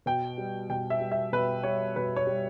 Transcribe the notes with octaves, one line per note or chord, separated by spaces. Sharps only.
B2 G5
G3
B2 G5
E5
G3
E5
B2 B4
G3 C#5
B2 B4
C#5
G3